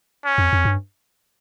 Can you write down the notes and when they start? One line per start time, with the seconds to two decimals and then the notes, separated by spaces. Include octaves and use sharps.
0.25 C#4
0.38 F2
0.53 F2
0.65 G2